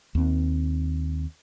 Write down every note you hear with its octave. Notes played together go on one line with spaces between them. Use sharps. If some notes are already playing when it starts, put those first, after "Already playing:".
D#2 C4